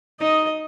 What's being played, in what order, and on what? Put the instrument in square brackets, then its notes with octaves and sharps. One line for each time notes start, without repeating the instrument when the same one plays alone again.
[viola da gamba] D#4 [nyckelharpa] D#5